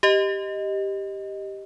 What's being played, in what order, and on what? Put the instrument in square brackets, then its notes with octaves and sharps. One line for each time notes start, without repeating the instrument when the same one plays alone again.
[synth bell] G4 D#5